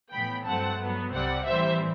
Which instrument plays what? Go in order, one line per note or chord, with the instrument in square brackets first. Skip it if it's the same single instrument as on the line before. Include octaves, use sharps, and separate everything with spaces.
[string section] A2 E3 B3 G5 B5
G2 F#3 A3 C4 F#5 A5
G2 F#3 B3
C2 C3 G3 C4 D5 F#5
A2 E3 G3 C4 C5 E5